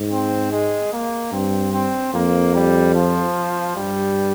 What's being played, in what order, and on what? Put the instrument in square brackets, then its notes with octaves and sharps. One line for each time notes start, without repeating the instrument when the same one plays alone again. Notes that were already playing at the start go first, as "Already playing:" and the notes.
Already playing: [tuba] G#2
[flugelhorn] C4
G#3
A#3
[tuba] G2 [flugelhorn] C4
[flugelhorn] C4
[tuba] F2 [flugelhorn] A#3
[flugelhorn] G3
F3
[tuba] G2 [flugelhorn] G3